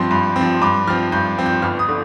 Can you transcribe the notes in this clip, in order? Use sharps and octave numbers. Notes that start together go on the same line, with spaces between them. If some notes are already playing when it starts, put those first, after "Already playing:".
Already playing: G2 F3 C4 C6
G2
C4
F3
G2 D6
F3 C4 F6
G2 G6
F3 C4
G6
G1 F6
D#6
D3